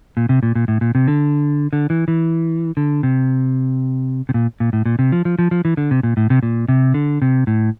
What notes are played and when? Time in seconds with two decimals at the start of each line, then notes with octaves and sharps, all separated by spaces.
0.17 A#2
0.29 C3
0.43 A#2
0.55 A#2
0.68 A2
0.81 A#2
0.95 C3
1.08 D3
1.73 D3
1.90 E3
2.08 E3
2.77 D3
3.03 C3
4.29 C3
4.34 A#2
4.60 A#2
4.73 A2
4.85 A#2
4.99 C3
5.12 F3
5.25 F3
5.39 F3
5.51 F3
5.65 E3
5.77 D3
5.91 C3
6.03 A#2
6.17 A2
6.30 C3
6.43 A#2
6.69 C3
6.94 D3
7.22 C3
7.47 A2